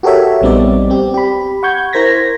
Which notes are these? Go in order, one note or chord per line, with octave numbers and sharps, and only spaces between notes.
F#4 G4 A4 A#4 C#5 E5
A#1 G3 B3 C4 D#4 D5
C4 G4
G4 B5
F#5 C#6 G6 G#6
E4 A#4 C5 G#6 A#6 B6